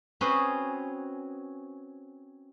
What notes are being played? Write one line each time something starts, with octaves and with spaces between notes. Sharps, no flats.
C4 C#4 F#4 G#4 B4 C5